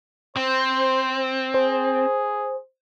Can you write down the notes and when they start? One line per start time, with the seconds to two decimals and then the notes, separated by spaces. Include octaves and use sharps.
0.36 C4 C5
1.54 G#4 C5